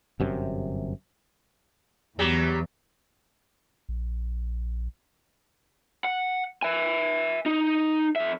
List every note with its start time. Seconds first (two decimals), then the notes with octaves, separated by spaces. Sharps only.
0.20 G1 F#2 C3
2.19 E2 F#3 G3 G4
3.89 A#1
6.04 F#5
6.63 E5 G#5
7.46 D#4
8.16 F2 E5